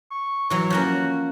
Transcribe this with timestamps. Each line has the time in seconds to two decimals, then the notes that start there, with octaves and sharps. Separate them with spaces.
0.11 C#6
0.50 E3 F#3 C#5
0.70 F3 A#3 C#4 F#4